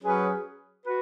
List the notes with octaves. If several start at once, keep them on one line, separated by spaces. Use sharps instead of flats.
F#3 C#4 G#4 B4
F#4 B4